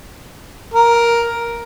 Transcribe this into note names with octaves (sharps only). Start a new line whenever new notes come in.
A#4